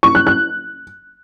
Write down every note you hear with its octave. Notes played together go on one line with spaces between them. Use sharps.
C#6
F#6
F#6